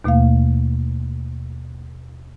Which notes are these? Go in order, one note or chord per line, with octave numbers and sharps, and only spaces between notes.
D#2 B2 A3 A#3 F5